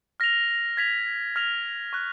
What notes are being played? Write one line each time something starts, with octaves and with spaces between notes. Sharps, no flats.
F6 A#6 F7
G#6 B6 F7
F6 A#6 F7
C#6 F#6 B6